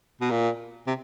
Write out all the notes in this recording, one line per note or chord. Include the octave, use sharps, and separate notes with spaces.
B2
A#2
C3